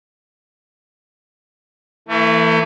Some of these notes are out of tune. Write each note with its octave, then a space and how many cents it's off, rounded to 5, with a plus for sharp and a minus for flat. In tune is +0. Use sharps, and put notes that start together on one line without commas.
E3 +0 A3 +40